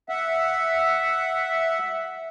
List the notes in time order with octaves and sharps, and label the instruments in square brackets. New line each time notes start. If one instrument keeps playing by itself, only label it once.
[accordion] E5 F#5